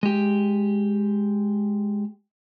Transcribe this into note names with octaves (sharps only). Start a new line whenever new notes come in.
G#3 G4